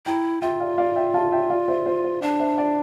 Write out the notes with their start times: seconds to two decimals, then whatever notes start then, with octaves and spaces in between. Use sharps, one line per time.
0.06 E4 G5 A#5
0.41 F4 E5 G5
0.60 D5 F5
0.78 D5 F5
0.96 E5 G5
1.14 F5 A5
1.32 E5 G5
1.50 D5 F5
1.68 C5 E5
1.86 C5
2.04 C5
2.22 D4 D5
2.40 C5 E5
2.58 D5